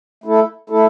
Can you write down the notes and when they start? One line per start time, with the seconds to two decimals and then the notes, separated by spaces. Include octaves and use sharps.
0.24 A3 E4 A4
0.70 A3 E4 A4